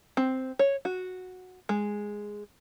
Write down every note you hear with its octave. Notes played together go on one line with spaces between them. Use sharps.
C4
C#5
F#4
G#3